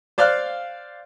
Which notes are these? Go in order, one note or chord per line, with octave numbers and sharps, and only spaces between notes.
C5 D5 F5 F6 F#6